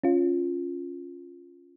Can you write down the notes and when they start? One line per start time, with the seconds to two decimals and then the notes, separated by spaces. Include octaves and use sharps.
0.03 C#4 F4